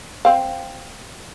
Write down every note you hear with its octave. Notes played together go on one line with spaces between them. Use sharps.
C4 F5